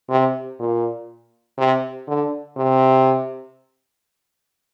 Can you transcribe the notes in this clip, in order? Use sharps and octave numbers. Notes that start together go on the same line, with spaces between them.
C3
A#2
C3
D3
C3